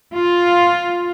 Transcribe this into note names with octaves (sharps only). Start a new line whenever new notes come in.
F4